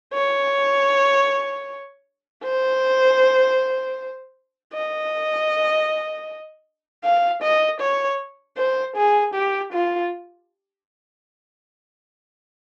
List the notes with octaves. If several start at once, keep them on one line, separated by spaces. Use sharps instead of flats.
C#5
C5
D#5
F5
D#5
C#5
C5
G#4
G4
F4